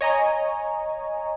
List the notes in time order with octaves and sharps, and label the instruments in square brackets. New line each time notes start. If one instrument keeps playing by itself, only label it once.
[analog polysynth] C#5 D#5 G#5 A#5 C#6